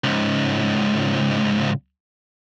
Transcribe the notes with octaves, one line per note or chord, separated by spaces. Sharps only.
C#2 G#2